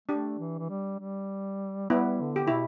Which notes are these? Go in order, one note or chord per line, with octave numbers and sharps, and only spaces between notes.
A3 D4 G4
E3
E3
G3
G3
G3 B3 E4
D3
G4
D3
B2 E4